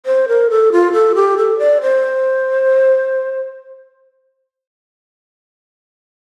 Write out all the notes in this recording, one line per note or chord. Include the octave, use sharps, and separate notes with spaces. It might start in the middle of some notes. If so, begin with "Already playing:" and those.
C5
A#4
A4
F4
A4
G4
A4
D5
C5